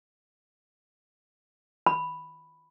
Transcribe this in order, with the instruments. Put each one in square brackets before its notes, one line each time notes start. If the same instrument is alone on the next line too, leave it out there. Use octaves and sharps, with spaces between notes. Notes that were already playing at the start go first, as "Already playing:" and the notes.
[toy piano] B5